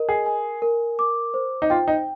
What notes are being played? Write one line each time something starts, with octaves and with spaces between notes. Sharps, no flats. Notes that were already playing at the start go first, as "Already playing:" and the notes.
Already playing: A#4 D#5
G#4
G#5
A#4
D6
C5
D#4
F4 G5
D#4